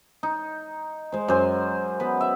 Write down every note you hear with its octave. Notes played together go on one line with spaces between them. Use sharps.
D#4
G#3 C5
F#2 C5 G#5
B3 B4
E5